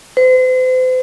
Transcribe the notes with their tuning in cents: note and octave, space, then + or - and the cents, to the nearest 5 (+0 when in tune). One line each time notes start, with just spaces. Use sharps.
C5 -40